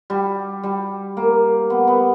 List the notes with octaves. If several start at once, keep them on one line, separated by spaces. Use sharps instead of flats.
G3
G3
A#3
B3
B3